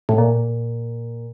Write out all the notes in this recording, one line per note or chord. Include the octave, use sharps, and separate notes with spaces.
A2
A#2